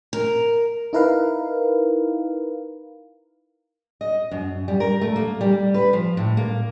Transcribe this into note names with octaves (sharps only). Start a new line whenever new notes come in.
A#4
D#4 E4 A#4 B4 F5
D#5
F#2
G3
A#4
A3
A#3
G3
B4
F3
A2
A#3